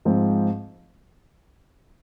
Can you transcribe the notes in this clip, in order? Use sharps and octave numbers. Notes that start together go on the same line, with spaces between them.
G#2 F3 C4